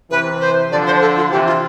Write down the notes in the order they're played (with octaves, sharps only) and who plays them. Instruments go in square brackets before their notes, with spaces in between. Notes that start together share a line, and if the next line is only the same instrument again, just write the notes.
[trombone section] C3 E3 [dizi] B4
[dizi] C5
[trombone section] D3 F3 [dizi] D5
[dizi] C5
A4
F4
[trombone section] C3 E3 [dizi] G4
[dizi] F4